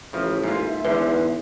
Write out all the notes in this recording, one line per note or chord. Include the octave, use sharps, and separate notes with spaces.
A1 C#3 F3 E5
G#2 A#3 F4
E2 G#2 D3 B4